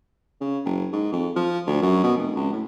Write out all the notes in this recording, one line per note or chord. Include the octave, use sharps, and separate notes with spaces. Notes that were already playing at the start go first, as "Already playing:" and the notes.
C#3
F#1
G#2
F2
F3
D2
F#2
B2
F1
C#2
A2